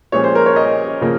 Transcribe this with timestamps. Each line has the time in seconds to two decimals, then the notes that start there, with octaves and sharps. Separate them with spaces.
0.12 A#2 F3 G#3 C#4 C#5
0.24 C5
0.35 A#4
0.46 C#5
0.56 D#5
1.01 C#3 F3 A#3